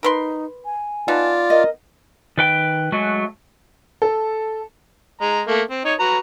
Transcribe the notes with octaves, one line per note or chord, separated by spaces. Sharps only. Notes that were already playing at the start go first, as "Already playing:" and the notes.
D#4 A#4 B4 C6
G#5
B3 D#4 F4 D5 A5
A#4 D#5
D#3 B4 G5
F#3 G#3 A3 F#4
A4
G#3 A#5
A3 A#3
C4
D#4 C#5
F#4 B4 A#5